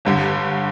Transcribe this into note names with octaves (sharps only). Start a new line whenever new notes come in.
G1 G2 D3